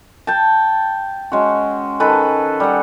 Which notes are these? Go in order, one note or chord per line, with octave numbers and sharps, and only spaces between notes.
G5 A5
G#3 C#4 F#4
D#3 G#4 A4 B4
G3 F#5